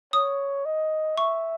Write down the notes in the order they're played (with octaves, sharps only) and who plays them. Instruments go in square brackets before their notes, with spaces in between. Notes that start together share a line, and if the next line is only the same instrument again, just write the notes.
[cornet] C#5 [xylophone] D#6
[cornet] D#5
[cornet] E5 [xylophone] C#6